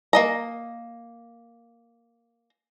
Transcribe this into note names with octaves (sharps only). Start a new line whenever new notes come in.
A#3 D#5 A#5